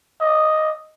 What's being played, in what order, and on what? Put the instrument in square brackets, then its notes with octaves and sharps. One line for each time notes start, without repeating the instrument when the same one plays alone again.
[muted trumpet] D#5